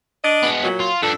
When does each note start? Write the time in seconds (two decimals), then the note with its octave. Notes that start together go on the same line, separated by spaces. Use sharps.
0.24 D4 D#5
0.44 G#3 B3
0.63 A#2 F#3
0.80 F4
1.02 G2 F3 D4 A4